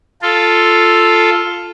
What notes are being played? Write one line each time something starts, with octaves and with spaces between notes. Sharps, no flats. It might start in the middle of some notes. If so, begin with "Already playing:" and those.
F4 A4